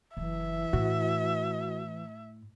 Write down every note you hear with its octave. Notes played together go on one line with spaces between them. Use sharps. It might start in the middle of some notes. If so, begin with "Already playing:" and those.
F#1 E3 E5
A2 F#4